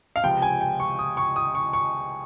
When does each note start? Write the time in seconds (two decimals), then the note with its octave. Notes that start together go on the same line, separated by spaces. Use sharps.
0.16 F5
0.23 C#2 C3 F3 G5
0.42 G#5
0.61 G5
0.80 C#6
0.99 D#6
1.17 C#6
1.36 D#6
1.55 C#6
1.73 C#6